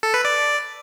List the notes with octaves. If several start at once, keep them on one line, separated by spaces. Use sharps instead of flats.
A4
B4
D5